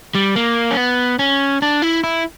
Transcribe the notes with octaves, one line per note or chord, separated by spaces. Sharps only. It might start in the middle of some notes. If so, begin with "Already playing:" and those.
G3
A#3
C#4
B3
C#4
D4
E4
E4